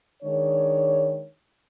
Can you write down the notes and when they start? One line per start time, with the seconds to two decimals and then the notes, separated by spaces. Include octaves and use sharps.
0.23 D#3 G#3 D4 C#5